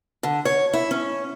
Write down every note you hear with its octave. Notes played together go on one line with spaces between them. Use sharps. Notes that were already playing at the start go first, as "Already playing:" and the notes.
D3
C#5
E4
C#4